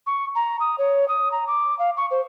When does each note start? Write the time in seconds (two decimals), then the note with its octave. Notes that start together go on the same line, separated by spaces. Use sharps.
0.07 C#6
0.35 A#5
0.60 D#6
0.78 C#5
1.08 D#6
1.32 A#5
1.47 D6
1.79 F5
1.97 C#6
2.11 C5